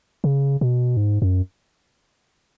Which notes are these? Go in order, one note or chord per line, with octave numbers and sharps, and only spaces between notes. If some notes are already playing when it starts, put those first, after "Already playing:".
C#3
B2
G#2
F#2